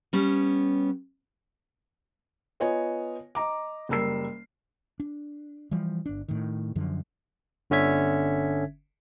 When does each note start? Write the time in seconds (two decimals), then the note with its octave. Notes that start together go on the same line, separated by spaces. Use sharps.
0.13 G3 B3 C#4
2.60 B3 F4 C#5 D#5 G#5
3.35 D#5 A#5 D6
3.89 F#1 G3 A#4 E6 C7
5.00 D4
5.71 E3 F3 G3
6.06 G1 D4
6.29 A2 D#3
6.76 F#2 D3 F3
7.70 G1 D3 C#4 E5 G#6 B6